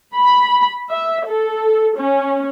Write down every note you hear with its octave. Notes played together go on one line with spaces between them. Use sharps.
B5
E5
A4
C#4